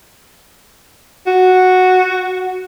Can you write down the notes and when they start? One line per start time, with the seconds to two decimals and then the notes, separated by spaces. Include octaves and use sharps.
1.27 F#4